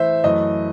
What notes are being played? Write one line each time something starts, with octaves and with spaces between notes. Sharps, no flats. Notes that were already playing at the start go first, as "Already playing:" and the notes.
Already playing: E3 A3 C5 E5
F#2 E3 A3 D#5